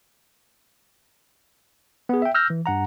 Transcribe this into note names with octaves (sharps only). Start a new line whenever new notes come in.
B3 G#4
E5 G5
E6 F6 G6 A#6
E3
G2 F#5 A#5